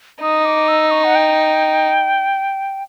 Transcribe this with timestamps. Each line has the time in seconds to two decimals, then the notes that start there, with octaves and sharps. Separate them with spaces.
0.21 D#4 D#6
0.45 D6
0.68 E6
0.91 C#6
1.04 F#5
1.15 G5